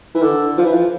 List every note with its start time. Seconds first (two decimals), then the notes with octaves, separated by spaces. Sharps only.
0.15 E3
0.22 D3
0.58 F3
0.65 E3
0.73 F3